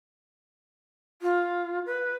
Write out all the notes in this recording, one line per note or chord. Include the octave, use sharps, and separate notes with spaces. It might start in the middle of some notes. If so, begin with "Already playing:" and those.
F4
B4